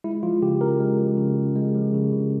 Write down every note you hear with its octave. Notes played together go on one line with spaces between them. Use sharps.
G#3 E4
F3 F4
C#3 G4
C#3 A#4
G#3
F3
C#3
C#3
G#3
F3
C#3
C#3